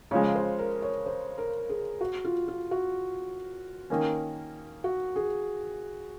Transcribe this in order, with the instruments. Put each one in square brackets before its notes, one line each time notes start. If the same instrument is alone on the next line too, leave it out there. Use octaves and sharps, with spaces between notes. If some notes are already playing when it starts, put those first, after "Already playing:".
[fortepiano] C#3 F3 G#3 [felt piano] C#5
[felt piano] C5
A#4
C#5
C5
A#4
G#4
F#4
F4
F4
F#4
[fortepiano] D#3 A#3 C#4
[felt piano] F#4
G#4